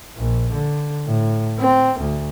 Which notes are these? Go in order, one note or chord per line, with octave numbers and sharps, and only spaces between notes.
A#1
D3
A2
C4
D2